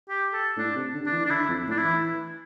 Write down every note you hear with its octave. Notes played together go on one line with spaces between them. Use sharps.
G4
A4
A2 D4
C3
D3
D4
E3
D4
D3 E4
F2
A2
D4
E4
E3